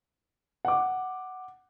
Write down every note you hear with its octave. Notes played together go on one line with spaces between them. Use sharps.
F#5 D6